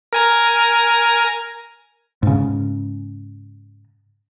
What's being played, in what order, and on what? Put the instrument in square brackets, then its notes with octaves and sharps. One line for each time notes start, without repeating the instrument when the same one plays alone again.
[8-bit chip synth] A#4 G#5 A#5
[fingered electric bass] G#2 C#3